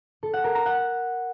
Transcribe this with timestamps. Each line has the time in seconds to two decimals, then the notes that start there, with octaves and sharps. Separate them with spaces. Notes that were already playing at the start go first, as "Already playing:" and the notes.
0.23 A4
0.33 F#5
0.44 A#4
0.55 A#5
0.66 F#5